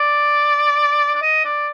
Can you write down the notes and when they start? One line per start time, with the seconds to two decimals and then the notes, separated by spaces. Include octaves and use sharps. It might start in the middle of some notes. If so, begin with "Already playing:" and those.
Already playing: D5
1.14 D5
1.22 D#5
1.45 D5